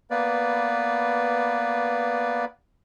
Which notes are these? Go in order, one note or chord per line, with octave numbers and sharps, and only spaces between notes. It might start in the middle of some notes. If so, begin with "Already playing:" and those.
A#3 B3 B4 D5